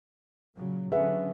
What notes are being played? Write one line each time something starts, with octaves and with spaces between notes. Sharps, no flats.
A#2 C#3 F#3
D3 F#3 C#4 G#4 B4 E5 F#5